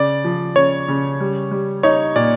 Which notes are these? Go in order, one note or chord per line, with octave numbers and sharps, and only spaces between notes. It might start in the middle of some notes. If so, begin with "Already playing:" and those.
Already playing: C#3 D5
F3
C#3 C#5
C#3
G3
G3
D#4 C#5
A#2 D5